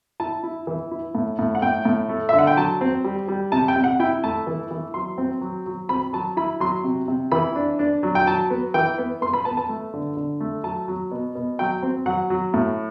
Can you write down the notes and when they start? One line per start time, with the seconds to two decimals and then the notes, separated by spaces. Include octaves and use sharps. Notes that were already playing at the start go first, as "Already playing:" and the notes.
0.20 E4 A5
0.43 E4
0.67 E3
0.91 E4
1.15 A2
1.39 A2
1.55 F#5
1.62 A2 G5
1.85 A2
2.09 A3
2.29 D3 E5
2.39 F#5
2.47 G5
2.57 F#3 A5
2.81 C4
3.04 G3
3.28 G3
3.52 C3 A5
3.68 G5
3.76 C3
3.84 F#5
4.00 E4 G5
4.24 A3 A5
4.47 E3
4.71 E3
4.94 F#3 C6
5.18 C4
5.41 F#3
5.66 F#3
5.89 C4 B5
6.13 F#3 A5
6.37 E4 B5
6.60 F#3 C6
6.84 C3
7.08 C3
7.32 E3 B5
7.56 D4
7.79 D4
8.03 F#3
8.15 G5
8.27 F#3 A5
8.50 B3
8.74 E3 G5
8.98 B3
9.21 B3 C6
9.34 B5
9.45 B3 A5
9.57 A5
9.69 A3
9.94 D3
10.17 D3
10.40 A3
10.64 F#3 A5
10.88 F#3
11.12 B2
11.35 B2
11.59 F#3 G5
11.83 C4
12.06 F#3 F#5
12.30 F#3
12.54 A2